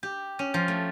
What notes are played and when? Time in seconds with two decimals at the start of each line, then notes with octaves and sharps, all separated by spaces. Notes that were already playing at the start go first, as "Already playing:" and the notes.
0.03 G4
0.39 C#4
0.54 F3
0.68 A3